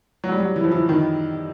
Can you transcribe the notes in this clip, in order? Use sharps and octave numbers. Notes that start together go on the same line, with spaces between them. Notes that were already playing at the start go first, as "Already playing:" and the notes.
F#3
G3
F#3
E3
F3
E3
D#3